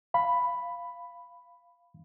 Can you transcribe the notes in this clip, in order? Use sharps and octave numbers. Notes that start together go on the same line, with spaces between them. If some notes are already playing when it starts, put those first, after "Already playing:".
F5 B5